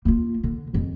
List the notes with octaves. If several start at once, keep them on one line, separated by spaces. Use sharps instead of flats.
A#3 F4
D3
F2 D#3